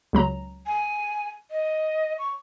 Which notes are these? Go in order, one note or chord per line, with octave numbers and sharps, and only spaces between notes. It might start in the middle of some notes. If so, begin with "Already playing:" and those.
C#2 F#3 A#5
G#5
D#5
C#6